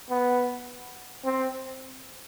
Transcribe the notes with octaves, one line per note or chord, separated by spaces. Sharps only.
B3
C4